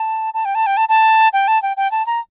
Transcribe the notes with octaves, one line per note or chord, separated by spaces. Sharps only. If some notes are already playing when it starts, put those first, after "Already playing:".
Already playing: A5
A5
G5
A5
G5
A5
A5
G5
A5
G5
G5
A5
A#5